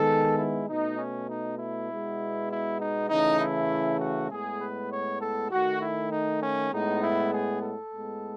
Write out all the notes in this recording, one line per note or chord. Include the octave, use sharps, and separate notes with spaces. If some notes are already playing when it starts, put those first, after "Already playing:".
Already playing: D#3 G#3 B3 A4
E4
B2 A3 D#4
C#4
D#4
E4
B2 G#3 B3
E4
D#4
C#3 E3 A3 D#4
E4
F#4
A2 G#3 B3 G#4
B4
C#5
A4
D#3 A3 F#4
E4
D#4
C#4
A2 G#3 B3 D#4
E4
G#4
A4
A2 G#3 B3